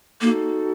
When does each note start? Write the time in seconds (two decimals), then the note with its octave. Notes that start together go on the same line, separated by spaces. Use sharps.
0.21 A#3 D#4 F#4 A4